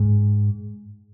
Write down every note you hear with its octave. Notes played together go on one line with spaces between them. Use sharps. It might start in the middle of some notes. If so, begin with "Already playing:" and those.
Already playing: G#2